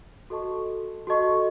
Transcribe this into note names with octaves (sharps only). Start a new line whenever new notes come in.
F#4 A4 D#5 A5 C#6
F#4 A4 D#5 A5 C#6